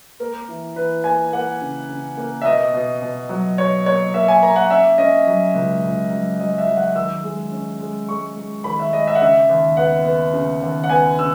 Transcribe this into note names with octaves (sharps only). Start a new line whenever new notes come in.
A#3 A#4
E3
E3 B4
A#3 G#5
A#3 F#5
C#3
C#3
A#3
E5
B2 D#5
B2
B2
F#3
B2 C#5
A#3 C#5
A#3 E5
G#5
A#3 A#5
F#5
C#4 E5
C#4 D#5
F#3
C#2
C#2
F#3
F#3 D#5
E5
F#3
F#5
D#3 E6
G#3
C#4
G#3
G#3 C#6
G#3
D#3 B5
E5
G#3 D#5
E5
F#5
C#3 E5
D#2
B3 F#5
B3
C#3
D#2
F#5
B3 G#5
C#3 E6